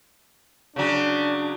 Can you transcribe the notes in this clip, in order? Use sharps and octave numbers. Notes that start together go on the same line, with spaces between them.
C#3 F#3 D4